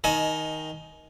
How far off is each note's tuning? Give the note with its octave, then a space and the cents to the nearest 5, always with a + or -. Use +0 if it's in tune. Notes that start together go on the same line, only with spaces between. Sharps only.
D#3 +10 D#5 +0 G#5 +25